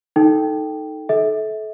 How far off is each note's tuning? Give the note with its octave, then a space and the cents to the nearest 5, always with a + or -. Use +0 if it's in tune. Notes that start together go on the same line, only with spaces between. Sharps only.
D#4 +0 A4 +0 G5 +0
A4 -30 E5 -30